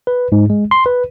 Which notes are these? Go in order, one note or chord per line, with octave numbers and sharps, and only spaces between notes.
B4
G#2
G#3
C6
B4